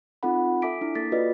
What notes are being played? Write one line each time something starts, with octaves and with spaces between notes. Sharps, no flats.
C4 D#4 F4 A4 F#5 B5
A4 E5 G#5 D6 B6 D7
D4 E4
A#3 A4 D6 A6 B6
F4 F#4 B4 D5 D#5